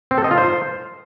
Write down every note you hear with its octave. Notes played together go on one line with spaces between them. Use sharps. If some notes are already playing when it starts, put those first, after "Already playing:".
C4
A4
D#5
F4
C5